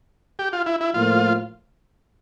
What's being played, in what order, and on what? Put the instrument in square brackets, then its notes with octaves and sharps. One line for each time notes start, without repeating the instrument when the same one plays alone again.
[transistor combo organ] G4
F4
E4
E4
[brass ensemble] A2 F3 A#3 [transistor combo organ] F4